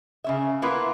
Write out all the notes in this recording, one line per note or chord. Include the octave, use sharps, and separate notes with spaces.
C#3 C#4 E5
A#3 B3 E4 F4 A#4 B4